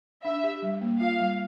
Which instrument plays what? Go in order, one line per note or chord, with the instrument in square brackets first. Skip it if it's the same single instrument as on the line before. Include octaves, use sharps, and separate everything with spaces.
[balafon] D4 [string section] E5
[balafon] G4
G3
A#3
[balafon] F4 [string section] F5
[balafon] G3